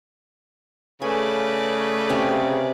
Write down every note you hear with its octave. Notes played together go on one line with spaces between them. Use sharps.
C#3 A3 B4 D5 G#5
C3 C#4 G4